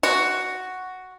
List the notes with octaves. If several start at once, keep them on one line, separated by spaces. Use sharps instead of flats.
F#4